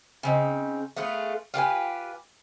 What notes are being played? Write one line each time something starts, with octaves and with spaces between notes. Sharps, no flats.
C#3 C4 D#4
A3 B3 F4 G#4
F4 G4 B4 G#5